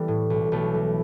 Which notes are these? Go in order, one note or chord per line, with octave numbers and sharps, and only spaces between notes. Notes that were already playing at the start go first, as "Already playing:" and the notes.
Already playing: E3 G3 A3 B3
A2
B1
B1 A3
E3